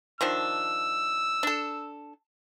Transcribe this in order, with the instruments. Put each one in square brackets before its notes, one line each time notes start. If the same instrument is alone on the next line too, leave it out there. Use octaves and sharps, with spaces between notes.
[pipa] D#3 F3 D4 [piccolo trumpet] E6
[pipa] D4 A4